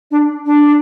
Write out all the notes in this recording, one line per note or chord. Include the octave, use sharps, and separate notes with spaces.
D4
D4